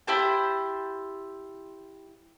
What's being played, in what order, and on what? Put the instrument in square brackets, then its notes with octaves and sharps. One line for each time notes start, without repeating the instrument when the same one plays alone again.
[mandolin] E4 G4 C5 A5